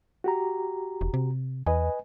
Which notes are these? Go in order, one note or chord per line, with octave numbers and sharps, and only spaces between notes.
F#4 G4 A#5
E1
C3
E2 B4 D#5 G#5